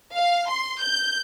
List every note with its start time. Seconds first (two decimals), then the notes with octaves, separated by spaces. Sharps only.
0.13 F5
0.48 C6
0.80 G6